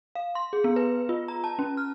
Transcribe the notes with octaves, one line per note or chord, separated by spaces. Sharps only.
F5
C6
G#4
B3
B4
F4
A#5
A5
C#4
F6